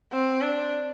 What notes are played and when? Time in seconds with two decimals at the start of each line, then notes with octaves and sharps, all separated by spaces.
0.13 C4
0.42 D4